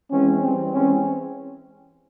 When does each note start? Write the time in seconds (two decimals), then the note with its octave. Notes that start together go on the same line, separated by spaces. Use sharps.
0.11 E3 G#3 C4 C#4
0.42 E3 G3 C4
0.73 E3 G#3 C4 C#4